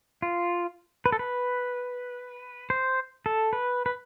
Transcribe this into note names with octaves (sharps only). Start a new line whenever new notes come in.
F4
B4
A4
B4
C5
A4
B4
B4